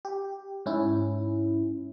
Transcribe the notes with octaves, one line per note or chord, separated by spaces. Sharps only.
G4
G#2 C#4 E4